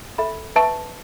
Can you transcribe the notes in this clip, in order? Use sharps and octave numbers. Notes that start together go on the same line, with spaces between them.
A4 E5 B5
B4 E5 A5 C#6